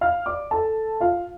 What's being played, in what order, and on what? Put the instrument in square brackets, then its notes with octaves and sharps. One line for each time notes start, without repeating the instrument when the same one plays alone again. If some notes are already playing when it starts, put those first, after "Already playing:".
[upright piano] F5 F6
D5 D6
A4 A5
F4 F5